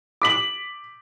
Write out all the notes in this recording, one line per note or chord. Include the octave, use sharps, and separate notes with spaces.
D6 B6 F#7